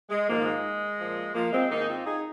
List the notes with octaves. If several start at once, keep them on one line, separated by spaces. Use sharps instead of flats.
G#3
G#2 D#3 F3 A#3
F3
G#3
A#2 F3
F3 A#3
G#3 C4
G#2 D#3 A#3 D#4
G#4
C4 F4
D#4 G#4